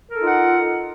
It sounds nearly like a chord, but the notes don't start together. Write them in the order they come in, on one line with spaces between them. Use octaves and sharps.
A#4 A4 D#4 F4 F#5